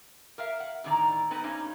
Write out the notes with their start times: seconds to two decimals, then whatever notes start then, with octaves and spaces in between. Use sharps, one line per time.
0.38 A#4 E5 F5
0.60 F#5
0.84 A2 D3 D#3 D4 D5 A#5
1.31 B3 C4 D#4 B4
1.44 G2 C#4 D#4